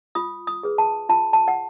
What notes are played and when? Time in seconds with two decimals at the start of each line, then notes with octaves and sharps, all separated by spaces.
0.15 F4 D#6
0.47 D#6
0.63 G#4 B4
0.78 A5
1.09 F4 A5
1.33 A5
1.48 F#5